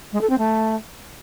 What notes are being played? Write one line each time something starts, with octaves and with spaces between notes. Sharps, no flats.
G#3
A4
C4
A3